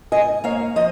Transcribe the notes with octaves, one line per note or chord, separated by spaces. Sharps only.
G#2 D#5 G#5
A#3 C#5 F5
F3 D#5